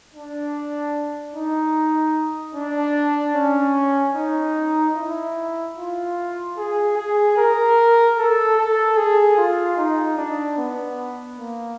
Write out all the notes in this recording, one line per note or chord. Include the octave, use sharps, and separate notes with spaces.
D4
D#4
D4
C#4
D#4
E4
F4
G#4
G#4
A#4
A4
A4
G#4
F4
D#4
D4
B3
A#3